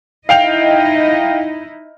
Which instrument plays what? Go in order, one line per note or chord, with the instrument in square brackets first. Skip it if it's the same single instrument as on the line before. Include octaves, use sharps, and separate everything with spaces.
[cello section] D#4 E4 D#5 [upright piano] F5 G5 F7